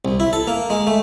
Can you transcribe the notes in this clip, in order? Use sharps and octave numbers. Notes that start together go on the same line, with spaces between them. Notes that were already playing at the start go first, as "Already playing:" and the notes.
C2
E4
A4
A#3
G#3
A3